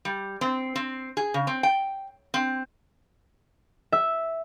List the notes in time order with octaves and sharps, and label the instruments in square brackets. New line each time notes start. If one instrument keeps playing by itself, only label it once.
[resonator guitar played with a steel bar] G3
C4
C4
G#4
C#3
C4
G5
C4
[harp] E5